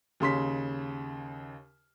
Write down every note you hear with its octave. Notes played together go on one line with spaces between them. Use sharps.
D#2 C#3 C6 B6